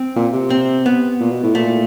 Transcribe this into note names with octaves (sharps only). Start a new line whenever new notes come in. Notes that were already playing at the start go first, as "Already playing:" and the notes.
Already playing: C4
A#2
C3
C4
B3
A#2
B2
A2
A#2 A3